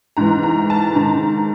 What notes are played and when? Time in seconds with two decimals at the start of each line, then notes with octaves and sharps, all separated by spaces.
0.17 G#2 E3 A#5
0.43 A#5
0.70 A5
0.95 G#2 D#3 A#5